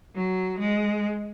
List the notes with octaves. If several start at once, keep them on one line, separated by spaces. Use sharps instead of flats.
F#3
G#3